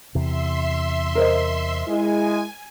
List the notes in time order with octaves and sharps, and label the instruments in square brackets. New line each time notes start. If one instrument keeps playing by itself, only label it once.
[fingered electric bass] E2 C3 [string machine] E5 C6
[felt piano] A#4 C5 D#5
[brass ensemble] G#3 E4 [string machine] G#5